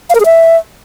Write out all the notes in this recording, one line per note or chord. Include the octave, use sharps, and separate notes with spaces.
F5
A#4
G#4
E5